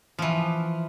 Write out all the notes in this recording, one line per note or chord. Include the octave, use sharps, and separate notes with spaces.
E3 F3